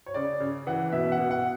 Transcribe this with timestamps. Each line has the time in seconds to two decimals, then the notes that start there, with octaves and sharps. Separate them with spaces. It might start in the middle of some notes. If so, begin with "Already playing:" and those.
0.06 C#5
0.14 C#3 D5
0.40 C#3
0.67 E3 F#5
0.92 B2 E5
1.12 F#5
1.18 B2
1.31 F#5